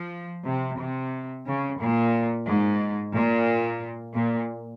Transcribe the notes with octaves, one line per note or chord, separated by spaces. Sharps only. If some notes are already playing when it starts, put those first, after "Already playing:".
Already playing: F3
C3
C3
C#3
A#2
G#2
A#2
A#2